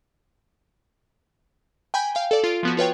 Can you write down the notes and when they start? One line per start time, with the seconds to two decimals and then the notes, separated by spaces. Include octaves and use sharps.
1.94 G5 G#5 B5 G6
2.15 F5 G5
2.31 A4 D5
2.44 F4 D7
2.63 F3 B3 F#4
2.77 F4 B4 C#5 G5